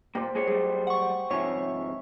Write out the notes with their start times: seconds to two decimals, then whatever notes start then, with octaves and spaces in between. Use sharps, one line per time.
0.15 A#2 A#3 G4 C5
0.35 G#3 G#4 C#5
0.47 F#3 G3 A3 G#4
0.87 F#5 C#6
1.31 G#2 C3 F3 C#5 E5 G#5 B5 C#6